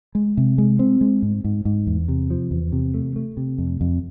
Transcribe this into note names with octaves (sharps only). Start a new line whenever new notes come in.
G#3
C3
G#3
C4
G#3
G#2
G#2
G#2
E2
C3
F3
E2
C3
A3
A3
C3
F2
F2